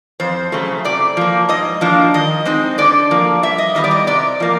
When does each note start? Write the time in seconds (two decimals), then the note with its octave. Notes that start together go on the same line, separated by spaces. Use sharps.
0.20 F2 C5
0.52 C#3 F#3 A3
0.84 C3 D5
1.17 F3 A#3
1.49 G#2 D#5
1.81 F3 A#3 D4
2.14 D#3 D#5
2.45 G#3 C4 D#4
2.78 D3 D5
3.11 F3 A#3
3.43 G2 E5
3.58 D#5
3.75 D#3 G3 B3 D#5
3.84 D5
3.91 D#5
4.07 C3 D5
4.40 F3 A#3